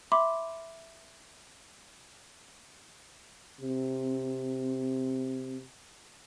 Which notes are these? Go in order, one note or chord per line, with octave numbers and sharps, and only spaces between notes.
E5 B5 C6 D6
C3 C4